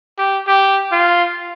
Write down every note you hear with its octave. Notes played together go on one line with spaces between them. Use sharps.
G4
G4
F4